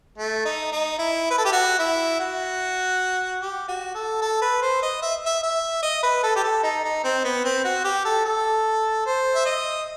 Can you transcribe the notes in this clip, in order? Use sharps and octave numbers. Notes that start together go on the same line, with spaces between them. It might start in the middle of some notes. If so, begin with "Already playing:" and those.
A3
D#4
D#4
E4
B4
A4
G4
F#4
E4
F#4
G4
F#4
A4
A4
B4
C5
D#5
E5
E5
E5
D#5
B4
A4
G4
A4
D#4
D#4
C4
B3
C4
F#4
G4
A4
A4
C5
E5
D#5